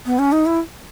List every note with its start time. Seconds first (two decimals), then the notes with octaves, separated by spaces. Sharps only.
0.06 B3
0.19 C#4
0.32 D#4
0.46 E4